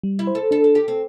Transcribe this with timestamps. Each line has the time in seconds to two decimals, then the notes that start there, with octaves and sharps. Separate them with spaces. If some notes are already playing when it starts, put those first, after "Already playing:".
0.03 G3
0.19 E4
0.27 C5
0.35 A4
0.51 D4 A4
0.64 A4
0.75 G4 A4
0.88 C4